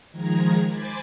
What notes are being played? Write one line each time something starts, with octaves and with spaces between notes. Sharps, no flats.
D#3 F3 G#3 A#5 G#6
C5 G#5 B5 D6 A6